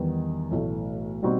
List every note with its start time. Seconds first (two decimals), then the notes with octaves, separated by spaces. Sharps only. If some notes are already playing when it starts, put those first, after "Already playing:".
Already playing: E2 D#3 G3 B3 D#4
0.51 B1 A2 E3 A3
1.23 B2 G3 C4 D#4 F#4